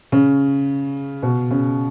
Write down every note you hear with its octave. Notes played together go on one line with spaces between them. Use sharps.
C#3
B2
C#3